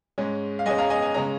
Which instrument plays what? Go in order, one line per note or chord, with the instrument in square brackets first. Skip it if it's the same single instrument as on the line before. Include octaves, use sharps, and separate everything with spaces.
[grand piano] G#2 G#3 C#4
F5
G#2 G#3 C#4 D#5 G#5
F5 A#5
D#5 G#5
G#5
C#3 G#3 C#4 A#5